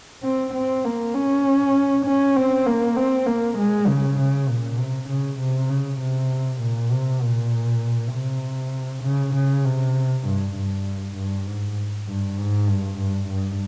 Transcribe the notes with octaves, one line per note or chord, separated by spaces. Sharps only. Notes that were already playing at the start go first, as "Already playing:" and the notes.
C4
C4
A#3
C#4
C#4
C4
A#3
C4
A#3
G#3
C#3
C#3
A#2
C3
C#3
C3
C#3
C3
A#2
C3
A#2
C3
C#3
C#3
C3
G2
G2
G2
G#2
G2
G#2
G2
G2
G2